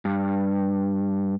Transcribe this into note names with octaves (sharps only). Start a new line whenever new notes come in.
G2